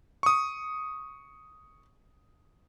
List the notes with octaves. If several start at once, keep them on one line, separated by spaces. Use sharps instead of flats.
C#6 D#6